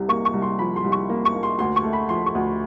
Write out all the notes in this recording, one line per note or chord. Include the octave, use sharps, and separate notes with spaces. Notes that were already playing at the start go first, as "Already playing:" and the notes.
Already playing: C2 C3
A#3 C#6
C#6
C2
C6
F3 B5
C6
C2
C#6
A#3
C#6
A#3
C6
D2 C6
C#6
A3
B5
F3 C6
C#6
D2